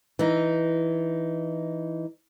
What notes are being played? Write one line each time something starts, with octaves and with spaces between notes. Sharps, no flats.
E3 D#4